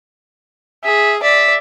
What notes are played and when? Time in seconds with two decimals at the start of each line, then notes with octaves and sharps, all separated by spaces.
0.84 G#4 E5
1.23 D5 E5